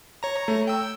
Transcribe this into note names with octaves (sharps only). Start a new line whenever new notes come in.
C#5 A#5
A3
G5 E6